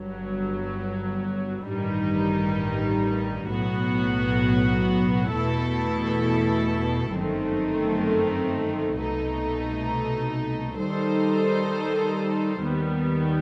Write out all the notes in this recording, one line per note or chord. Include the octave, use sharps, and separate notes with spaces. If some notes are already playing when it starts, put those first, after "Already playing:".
Already playing: G1 G2 F#3
A1 G2 D#3 G3 D#4
B1 A2 F#3 B3 F#4
E2 B2 A3 E4 A4
G1 F#2 D#3 A3 C4
C2 B2 A3 D#4
D#3 G3 D#4 A4 C5
D#2 D#3 G3 B3